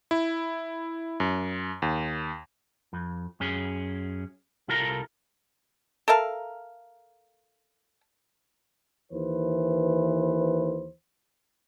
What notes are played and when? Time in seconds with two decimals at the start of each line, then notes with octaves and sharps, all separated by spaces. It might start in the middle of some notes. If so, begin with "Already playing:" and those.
0.11 E4
1.20 F#2
1.82 D#2
2.93 F2
3.40 F#2 C#4 G#4
4.68 C2 E4 F4 A4 A#4 A#5
6.08 A4 A#4 E5 F5
9.11 D#2 E3 B4 C5